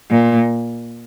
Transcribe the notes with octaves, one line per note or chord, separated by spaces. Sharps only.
A#2